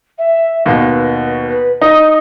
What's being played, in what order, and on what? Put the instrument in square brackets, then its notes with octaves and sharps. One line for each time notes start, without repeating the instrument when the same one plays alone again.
[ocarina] E5
[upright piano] D#2 B2 [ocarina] B4
[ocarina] B4
[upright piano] D#4 [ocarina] D#6